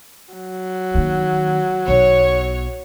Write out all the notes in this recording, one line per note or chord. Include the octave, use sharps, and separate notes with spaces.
F#3
D#3 A#3
B1 B3 C#5